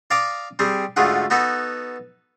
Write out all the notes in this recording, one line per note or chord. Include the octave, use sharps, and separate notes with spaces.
D5 F5 G#5 A#5 D6 D#6
G3 C4 G#4
D2 G#2 A3 F4 G#4 F#5
B3 D#4 F#4 A4 B4